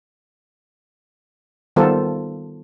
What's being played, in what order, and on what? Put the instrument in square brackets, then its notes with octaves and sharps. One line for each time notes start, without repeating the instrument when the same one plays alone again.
[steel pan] D#3 G3 B3 F4 A4 C5